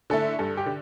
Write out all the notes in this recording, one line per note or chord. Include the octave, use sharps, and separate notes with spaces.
D3 A3 E4 A4
G2 A4
G4
D3